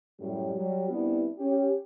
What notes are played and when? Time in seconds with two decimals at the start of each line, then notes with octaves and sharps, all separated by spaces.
0.20 F#2 A2 G3
0.54 F#3 G3
0.88 G3 B3 C4 D4 E4
1.38 C#4 G4